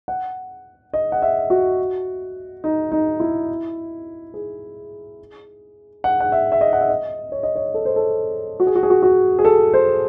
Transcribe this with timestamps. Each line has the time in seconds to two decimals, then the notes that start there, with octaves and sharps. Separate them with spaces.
0.08 F#5
0.93 D#5
1.12 F#5
1.22 E5
1.50 F#4
2.64 D#4
2.92 D#4
3.20 E4
4.34 G#4
6.04 F#5
6.20 F#5
6.32 E5
6.52 E5
6.61 D#5
6.73 F#5
6.81 E5
6.89 D#5
7.32 C#5
7.43 D#5
7.56 C#5
7.74 A4
7.85 C5
7.96 A4
8.60 F#4
8.67 G#4
8.75 F#4
8.83 G#4
8.90 F#4
9.02 F#4
9.39 G#4
9.45 A4
9.74 C5